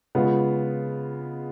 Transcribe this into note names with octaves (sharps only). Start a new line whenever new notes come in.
C#3 G#3 B3 F4